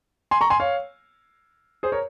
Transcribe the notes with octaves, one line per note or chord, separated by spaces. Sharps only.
G#5 C6
A#5 C#6
G#5 C6
C#5 F5
G#4 C5
A#4 C#5